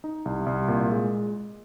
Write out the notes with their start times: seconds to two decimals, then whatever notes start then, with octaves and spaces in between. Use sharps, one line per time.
0.04 D#4
0.25 C2
0.46 C2
0.68 A#2
0.90 G#3